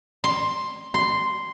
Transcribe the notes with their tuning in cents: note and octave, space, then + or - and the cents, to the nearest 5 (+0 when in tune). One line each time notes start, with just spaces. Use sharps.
C6 +5
C6 -5